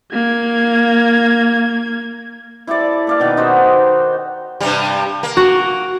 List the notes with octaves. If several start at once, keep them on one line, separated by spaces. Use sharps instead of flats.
A#3 G#6
E4 G4 A4 D5
A#3 D5 F5
B2 D#3 B4
D#4 F#4 G4 C5
G2 C3 G3
A#3
F#4